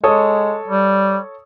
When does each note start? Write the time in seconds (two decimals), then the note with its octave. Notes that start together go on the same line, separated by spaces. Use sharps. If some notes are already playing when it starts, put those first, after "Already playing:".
0.04 G#3 A4 C#5 D#6
0.68 G3